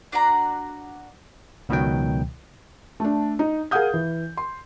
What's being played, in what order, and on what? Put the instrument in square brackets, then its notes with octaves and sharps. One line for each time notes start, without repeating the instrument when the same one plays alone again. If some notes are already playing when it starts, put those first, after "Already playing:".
[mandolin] D4 F#4 D5 A#5
[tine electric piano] C#2 B2 D#3 F#3 G5
[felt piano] A3 D4
D#4
G#4 A#4 F5 F#5 D#6 G6
E3
C6